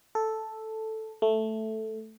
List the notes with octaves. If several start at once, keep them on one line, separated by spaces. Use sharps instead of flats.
A4
A3